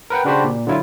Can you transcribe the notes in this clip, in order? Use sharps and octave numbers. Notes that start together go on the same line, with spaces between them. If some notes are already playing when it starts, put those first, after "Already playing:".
A#4 B4 F#5 G5
C#3 D4 F#4 G4 C5 B5
A#2
D3 F#3 E4 F4